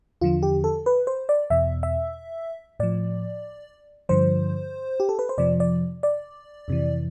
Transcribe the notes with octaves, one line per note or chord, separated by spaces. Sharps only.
E2 D3 F3 F4
G4
A4
B4
C5
D5
E2 B2 E5
E5
A2 F3 D5
G2 D3 F3 C5
G4
A4
B4
C5
F2 C3 F3 D5
D5
D5
F2 C3 E3